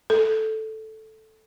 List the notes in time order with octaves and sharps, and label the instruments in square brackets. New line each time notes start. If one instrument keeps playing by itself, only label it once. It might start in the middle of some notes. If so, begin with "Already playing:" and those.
[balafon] A4